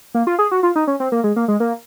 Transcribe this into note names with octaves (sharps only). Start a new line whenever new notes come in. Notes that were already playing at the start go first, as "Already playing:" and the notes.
A#3
F4
G#4
F#4
F4
D#4
C#4
C4
A#3
G#3
A#3
G#3
A#3